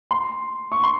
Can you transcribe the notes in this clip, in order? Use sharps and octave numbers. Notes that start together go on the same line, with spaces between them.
C6
C#6
C6